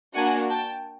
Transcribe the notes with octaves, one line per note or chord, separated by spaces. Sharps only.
A#3 D4 F#4 F#5 G#5
G5 A5